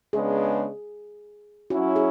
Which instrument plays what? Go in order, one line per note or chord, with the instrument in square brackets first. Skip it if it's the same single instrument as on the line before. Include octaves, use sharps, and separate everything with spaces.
[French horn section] C#3 G#3 B3 D4 [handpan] G#4
[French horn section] F#3 C#4 E4 [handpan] F#4
[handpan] G#4